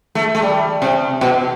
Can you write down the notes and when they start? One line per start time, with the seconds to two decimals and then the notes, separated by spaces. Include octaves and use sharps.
0.15 A3
0.35 A3
0.42 G3
0.82 C3
1.21 B2